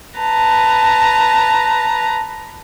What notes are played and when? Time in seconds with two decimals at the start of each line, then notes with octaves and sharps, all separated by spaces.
0.19 B4 A5 A#5